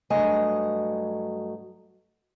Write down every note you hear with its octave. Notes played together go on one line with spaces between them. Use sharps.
G2 F#3 A3 D#5 G#5